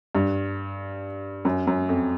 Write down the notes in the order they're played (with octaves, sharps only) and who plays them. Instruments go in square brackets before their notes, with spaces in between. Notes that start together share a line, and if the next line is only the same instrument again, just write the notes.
[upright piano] G2
F#2
F#2
F2